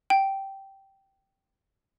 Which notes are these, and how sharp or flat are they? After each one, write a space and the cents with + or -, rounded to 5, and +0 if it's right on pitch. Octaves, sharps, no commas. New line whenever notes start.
G5 -10